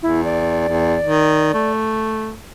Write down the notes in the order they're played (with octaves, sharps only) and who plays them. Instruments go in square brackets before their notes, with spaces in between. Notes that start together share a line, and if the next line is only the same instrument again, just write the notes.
[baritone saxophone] E2 [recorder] E4
[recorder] D5
[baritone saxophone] E2
D#3
A3